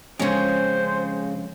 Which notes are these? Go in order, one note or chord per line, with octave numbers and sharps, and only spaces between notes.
F2 C#3 G#3 C#4 C5